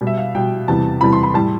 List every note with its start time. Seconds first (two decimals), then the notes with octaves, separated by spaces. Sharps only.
0.01 B2 G3
0.07 E5
0.18 F5
0.35 B2 G3 G5
0.68 E2 C3 E3 G3 A5
1.01 E2 C3 E3 G3 B5
1.13 C6
1.23 B5
1.34 A2 G3 A5